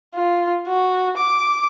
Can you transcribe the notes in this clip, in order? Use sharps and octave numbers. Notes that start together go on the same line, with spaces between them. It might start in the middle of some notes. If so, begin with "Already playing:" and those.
F4
F#4
D6